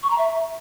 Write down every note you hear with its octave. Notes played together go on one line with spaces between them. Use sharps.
C#6
A#5
E5